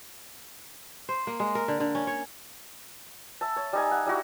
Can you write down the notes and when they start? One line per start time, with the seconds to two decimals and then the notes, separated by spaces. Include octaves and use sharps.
1.09 C5
1.27 A#3
1.40 G#3
1.55 A#4
1.68 D3
1.80 D3
1.95 C#4
2.07 C#5
3.41 E5 A5
3.56 C#5
3.73 G3 D#4 G#5
3.91 F#5
4.06 G3 E4 F#4